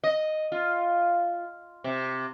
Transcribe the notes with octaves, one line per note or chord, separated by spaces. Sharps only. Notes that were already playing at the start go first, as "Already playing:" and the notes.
D#5
F4
C3